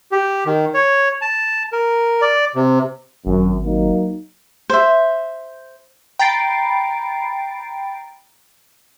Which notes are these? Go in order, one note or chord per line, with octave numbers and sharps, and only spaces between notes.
G4
D#3
C#5
A5
A#4
D5
C3
G#1 F#2
F#3 A#3 D#4
C5 E5
G5 A#5 B5 A6 C7 D7